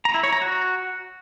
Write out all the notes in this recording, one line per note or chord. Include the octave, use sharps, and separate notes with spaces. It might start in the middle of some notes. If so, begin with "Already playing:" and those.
A#5
E4
C#5
A#5
F#4